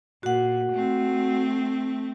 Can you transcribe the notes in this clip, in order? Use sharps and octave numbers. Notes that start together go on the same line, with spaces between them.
A#2 F#4 F#5
A3 C4